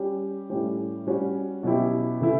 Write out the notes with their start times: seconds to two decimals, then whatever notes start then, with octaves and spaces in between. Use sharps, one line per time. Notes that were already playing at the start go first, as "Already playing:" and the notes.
Already playing: G3 C#4 G4
0.50 A2 G3 C#4 G4
1.07 G3 C#4 F#4
1.63 B2 F#3 C#4 E4 G4
2.21 C#3 E3 A3 E4